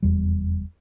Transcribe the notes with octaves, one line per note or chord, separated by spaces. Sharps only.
F1 E2 G3